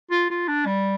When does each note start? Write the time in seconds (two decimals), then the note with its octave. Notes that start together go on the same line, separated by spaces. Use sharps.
0.11 F4
0.30 F4
0.48 D4
0.66 G3